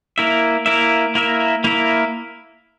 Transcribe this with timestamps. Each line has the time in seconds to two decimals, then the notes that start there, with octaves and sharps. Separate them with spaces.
0.18 A#3 E4 A#4 E5
0.66 A#3 E4 A#4 E5
1.15 A#3 E4 A#4 E5
1.64 A#3 E4 A#4 E5